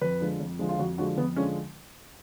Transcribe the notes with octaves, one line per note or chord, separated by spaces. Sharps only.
F2 B4
D3 F3 G#3
F2
D3 F3 G#3
F4
F2 F#4
D3 F3 G#3 F#4
F2 B3
D3 F3 G#3 C#4